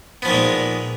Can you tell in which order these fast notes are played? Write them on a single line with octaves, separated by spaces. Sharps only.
B3 F3 D#3 A#2 G#3